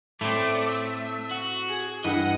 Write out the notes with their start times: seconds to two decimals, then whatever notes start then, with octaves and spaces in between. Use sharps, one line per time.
0.21 A2 A3 C4 D5
0.70 E5
1.31 F#4
1.68 G#4
2.05 G2 E3 D#5 F#5